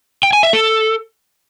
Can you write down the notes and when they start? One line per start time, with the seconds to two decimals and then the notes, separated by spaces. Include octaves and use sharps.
0.23 G5
0.33 G#5
0.43 E5
0.53 A4